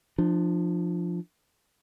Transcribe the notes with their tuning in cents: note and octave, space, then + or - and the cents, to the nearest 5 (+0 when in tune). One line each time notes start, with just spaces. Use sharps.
F3 +0 D4 +35